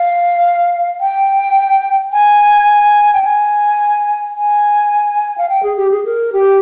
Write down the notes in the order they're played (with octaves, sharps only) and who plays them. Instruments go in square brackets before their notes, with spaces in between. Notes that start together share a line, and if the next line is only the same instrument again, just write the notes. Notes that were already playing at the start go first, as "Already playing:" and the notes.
Already playing: [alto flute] F5
G5
G#5
G5
G#5
G#5
F5
G5
G#4
G4
G#4
A#4
G4